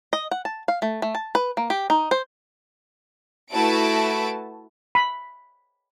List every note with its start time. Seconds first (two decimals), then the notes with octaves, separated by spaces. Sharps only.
0.13 D#5
0.31 F#5
0.45 A5
0.68 F5
0.82 A3
1.02 A3
1.15 A5
1.35 B4
1.57 A#3
1.70 G4
1.90 D#4
2.11 C5
3.52 A3 E4 F#4 B4 A5 D7
4.95 B5